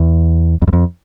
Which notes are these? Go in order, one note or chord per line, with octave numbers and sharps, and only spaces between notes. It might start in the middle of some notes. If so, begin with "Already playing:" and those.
Already playing: E2
F2
F#2
F2